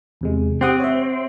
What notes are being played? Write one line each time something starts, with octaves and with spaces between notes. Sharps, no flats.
E2 C3 G#3
C4 G4 F#5 D#6
C#5 E5